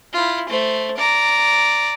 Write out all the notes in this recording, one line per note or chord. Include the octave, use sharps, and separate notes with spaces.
E4 F4
A3 C5
D5 A#5